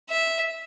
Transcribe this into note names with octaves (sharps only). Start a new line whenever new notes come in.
E5